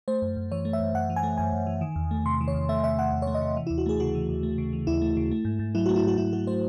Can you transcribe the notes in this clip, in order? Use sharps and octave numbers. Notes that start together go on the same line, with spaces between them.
A3 C5
F#2
F#2
E3 C#5
A3
E5
F#2
F#2 F#5
E3
G#5
A3
F#2 G#5
F#2
E3
D#3
E2
A3
C3 C6
D#3
C#5
E2
A3 E5
C3 E5
D#3 F#5
E2
C#5
A3
D#5
C3
E3
D#2 E4
F#4
A3 G#4
C#3 F#4
E3
D#2
A3
C#3
E3
D#2 E4
A3
C#3
A3
G#2
G#2
F#3 E4
A3 F#4
E4
G#2 F#4
G#2 E4
F#3 F#4
A3 C5